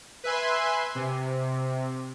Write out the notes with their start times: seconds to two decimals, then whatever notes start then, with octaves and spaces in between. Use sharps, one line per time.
0.24 B4 E5 G#5 C6
0.95 C3